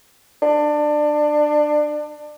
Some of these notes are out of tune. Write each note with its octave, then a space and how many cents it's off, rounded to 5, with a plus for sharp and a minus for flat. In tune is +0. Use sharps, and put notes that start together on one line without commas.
D4 +20